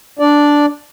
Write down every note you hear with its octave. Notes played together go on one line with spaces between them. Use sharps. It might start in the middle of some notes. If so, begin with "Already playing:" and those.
D4 D5